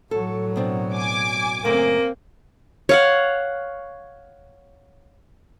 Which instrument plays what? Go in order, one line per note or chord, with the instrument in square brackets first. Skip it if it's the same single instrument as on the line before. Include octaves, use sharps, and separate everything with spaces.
[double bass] A2 F#3 [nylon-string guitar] A4
[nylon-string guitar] B2 C4 D4
[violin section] G#5 D6
[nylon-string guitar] F#2 C#3 A3 [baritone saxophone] A#3 [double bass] C4
[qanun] C#5 F5 F#5